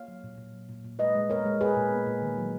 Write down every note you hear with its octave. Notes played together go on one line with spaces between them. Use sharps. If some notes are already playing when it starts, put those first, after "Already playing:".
Already playing: A#3 C#5 F5
F#3
A#2
A#2
F#3
A#2
A#2
G#3 B4 D#5
G#3
B3 A#4 C#5
G#3
B3 G#4 B4
A#2
B3
A#2
D#3
F#3